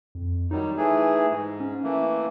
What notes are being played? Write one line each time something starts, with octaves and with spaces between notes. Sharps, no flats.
F2
D#3 F#3 G3 D#4
E3 A3 G#4
G#2
C#4
E3 A3 A#3